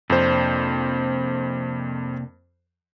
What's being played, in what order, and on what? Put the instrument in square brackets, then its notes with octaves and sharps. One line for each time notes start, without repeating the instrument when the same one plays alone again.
[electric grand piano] F2 C5 [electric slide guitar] C3 A#3 D4